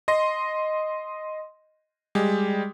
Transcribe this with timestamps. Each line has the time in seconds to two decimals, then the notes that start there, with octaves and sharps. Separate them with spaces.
0.08 D#5 C6 A#6
2.15 G3 G#3